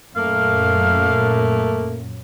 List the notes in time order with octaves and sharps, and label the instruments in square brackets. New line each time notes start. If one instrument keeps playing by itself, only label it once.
[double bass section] F#2 A#2 [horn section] A3 A#3 [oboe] F5